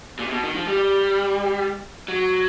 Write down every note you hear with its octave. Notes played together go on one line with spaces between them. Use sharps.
A#2
C3
B2
D#3
F3
G3
F#3